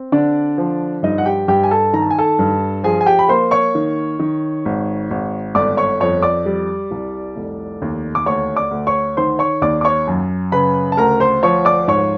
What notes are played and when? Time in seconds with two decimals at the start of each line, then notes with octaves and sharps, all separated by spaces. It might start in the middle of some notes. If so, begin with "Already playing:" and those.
Already playing: C4
0.12 D3 D4 D5
0.58 F3
1.03 G2 D#4 D#5
1.18 F#5
1.26 G4 G5
1.48 G2 G4 G5
1.63 G#5
1.71 A4 A5
1.93 D#3 A#5
2.02 A5
2.11 G#5
2.18 A4 A5
2.39 G2
2.84 F3 G#4 G#5
3.01 G#5
3.06 G4 G5
3.19 B5
3.29 A#3 C5 C6
3.51 C#5 C#6
3.75 D#3
4.20 D#3
4.65 G#1
5.11 G#1
5.55 G1 D5 D6
5.77 C#5 C#6
6.00 F2 C#5 C#6
6.22 D5 D6
6.46 G3
6.91 C2
7.36 F1
7.82 D#2
8.15 D6
8.26 D2 C#5 C#6
8.56 D5 D6
8.71 D2
8.87 C#5 C#6
9.17 D#3 C5 C6
9.39 C#5 C#6
9.62 D#2 D5 D6
9.81 D6
9.85 C#5 C#6
10.07 F#2
10.52 C#3 B4 B5
10.92 A5
10.97 D2 A#4 A#5
11.20 C5 C6
11.43 F3 C#5 C#6
11.65 D5 D6
11.88 G#2 C#5 C#6